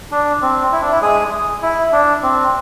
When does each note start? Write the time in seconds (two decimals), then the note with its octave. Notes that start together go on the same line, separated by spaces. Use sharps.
0.12 D4
0.42 C4
0.72 E4
0.82 D4
0.91 E4
1.02 G#3 G#4
1.62 E4
1.92 D4
2.23 C4